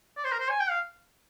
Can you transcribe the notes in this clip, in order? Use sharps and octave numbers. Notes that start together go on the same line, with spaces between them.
D5
C5
A#4
C5
G#5
G5
F5